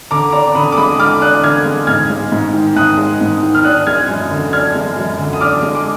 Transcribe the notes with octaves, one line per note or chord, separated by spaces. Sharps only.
D3 A#5 D6
D4 A#5 D6
D3 B5 D#6
D6
G#3 B5 D#6
D3 D6 F6
D4 D#6 F#6
D3 F6 G#6
G#3
G#2 F6 G#6
G#3
G#2
D#3
G#2 D#6 F#6
G#3
G#2
D#3
F6
D4 D#6 F#6
G#3 F6 G#6
F#2
D3
D4 F6 G#6
G#3
F#2
D3
D#6
D4 D6 F6
G#3
D6